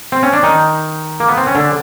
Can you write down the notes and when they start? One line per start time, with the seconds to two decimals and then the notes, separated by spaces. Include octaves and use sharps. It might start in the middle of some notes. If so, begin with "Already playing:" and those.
0.12 C4
0.23 C#4
0.33 D4
0.43 D#3 D#4
1.20 A#3
1.28 B3
1.37 C4
1.47 C#4
1.55 D3 D4